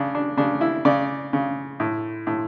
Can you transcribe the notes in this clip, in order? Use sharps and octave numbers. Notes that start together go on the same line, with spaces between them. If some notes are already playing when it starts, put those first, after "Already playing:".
Already playing: C#3 D4
D4
C#3 D4
E4
C#3 D5
C#3
A2
A2